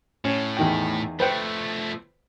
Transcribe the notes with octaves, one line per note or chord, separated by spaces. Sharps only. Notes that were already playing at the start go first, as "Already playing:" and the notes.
A2 C#4
E2 D#3 G5
F3 A3 B4 C5 G5